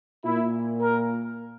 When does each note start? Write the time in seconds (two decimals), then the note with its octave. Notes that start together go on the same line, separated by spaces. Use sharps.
0.25 A#2 E4
0.80 A#4